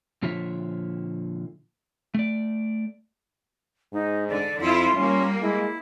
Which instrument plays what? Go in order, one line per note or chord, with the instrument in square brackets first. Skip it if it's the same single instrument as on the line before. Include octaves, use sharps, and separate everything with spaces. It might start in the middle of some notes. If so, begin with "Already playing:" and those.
[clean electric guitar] A#2 D3 F3 F4 C#5 E5
A3 D5
[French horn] G#2 [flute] D#4
[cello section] D3 [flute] D5
[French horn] F2 [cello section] E4 F4 [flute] C6
[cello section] G3 A#3 [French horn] C#4
[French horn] G#3 [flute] E4